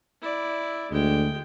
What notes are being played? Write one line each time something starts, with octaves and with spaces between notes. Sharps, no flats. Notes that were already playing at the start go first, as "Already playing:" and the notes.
E4 D5
D2 G#3 G5